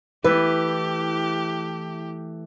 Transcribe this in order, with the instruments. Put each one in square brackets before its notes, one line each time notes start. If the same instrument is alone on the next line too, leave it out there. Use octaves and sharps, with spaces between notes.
[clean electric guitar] E3 A3 [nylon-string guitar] E4 B4 [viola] G4